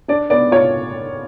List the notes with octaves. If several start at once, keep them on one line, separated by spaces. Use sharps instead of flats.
D4 D5
B3 D5
F4 C#5